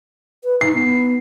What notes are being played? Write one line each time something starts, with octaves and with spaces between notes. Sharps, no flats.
B4
D#4 C7
B3